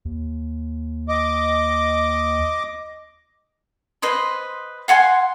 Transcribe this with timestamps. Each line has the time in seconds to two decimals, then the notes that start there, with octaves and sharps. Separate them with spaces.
0.05 D#2
1.09 D#5 D6
4.02 B4 C5 D#5 C6
4.88 F5 F#5 G#5 C6